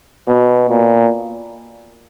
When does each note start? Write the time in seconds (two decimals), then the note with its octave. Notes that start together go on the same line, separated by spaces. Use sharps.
0.27 B2
0.70 A#2